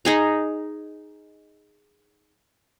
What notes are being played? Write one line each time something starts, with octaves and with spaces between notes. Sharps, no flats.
D#4 G#4 A#5